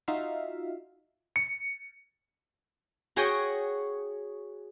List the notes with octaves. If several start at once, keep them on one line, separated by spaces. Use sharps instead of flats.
D#4 F4 F#4 E5 F5
C#7
F#4 G#4 C#5 D#5 G5 G#5